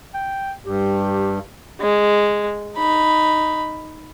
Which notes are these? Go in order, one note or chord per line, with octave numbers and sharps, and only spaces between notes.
G5
G2 G4
G#3
D#4 B5